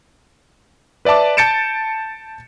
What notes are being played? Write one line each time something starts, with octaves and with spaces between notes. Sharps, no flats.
B4 D5 E5 A5 D6
A5 G6 A6 C#7 D7 E7